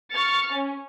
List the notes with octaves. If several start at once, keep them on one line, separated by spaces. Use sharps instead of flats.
C#6 F6 A6 C#7
C#4